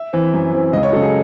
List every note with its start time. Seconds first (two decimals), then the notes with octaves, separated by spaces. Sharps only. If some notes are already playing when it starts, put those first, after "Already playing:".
Already playing: E5
0.13 E3 C4
0.33 F#2
0.53 E3 C4
0.72 C#2 D#5
0.83 C#5
0.92 C#3 F#3 A4
1.02 G#4